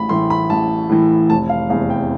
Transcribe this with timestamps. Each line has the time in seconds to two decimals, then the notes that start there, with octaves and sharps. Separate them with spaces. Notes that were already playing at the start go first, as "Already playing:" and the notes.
Already playing: A1 B5
0.09 A2 E3 C6
0.30 B5
0.50 A1 A5
0.90 A2 E3
1.30 F1 A5
1.49 F5
1.70 E2 F5
1.74 C3
1.90 G5